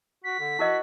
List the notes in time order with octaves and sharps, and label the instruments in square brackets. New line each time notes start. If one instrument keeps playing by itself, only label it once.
[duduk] F#4 [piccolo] B6
[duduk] D3
[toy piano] E4 A#4 D#5 [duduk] F#4